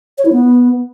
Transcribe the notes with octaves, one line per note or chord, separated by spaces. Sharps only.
C#5
E4
B3